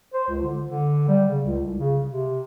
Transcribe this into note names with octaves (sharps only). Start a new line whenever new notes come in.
C5
C#2
D3
D3
G3
C#3
C#2
C2
C#3
C3